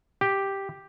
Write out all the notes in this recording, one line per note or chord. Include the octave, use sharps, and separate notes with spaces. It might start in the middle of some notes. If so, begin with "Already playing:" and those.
G4